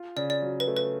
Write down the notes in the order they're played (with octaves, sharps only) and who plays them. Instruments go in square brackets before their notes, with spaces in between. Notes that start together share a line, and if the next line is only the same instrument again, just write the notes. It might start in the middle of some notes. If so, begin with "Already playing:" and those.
Already playing: [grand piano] F4
[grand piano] C#3 [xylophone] D5
[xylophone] D5
[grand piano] F#3
[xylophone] B4
[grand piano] A3
[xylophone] B4